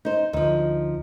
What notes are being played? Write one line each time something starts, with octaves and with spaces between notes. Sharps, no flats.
D#4 C5
D2 F3 D#4